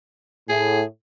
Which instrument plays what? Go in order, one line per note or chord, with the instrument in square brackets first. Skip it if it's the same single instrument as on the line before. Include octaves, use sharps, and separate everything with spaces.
[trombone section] A2 [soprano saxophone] G#4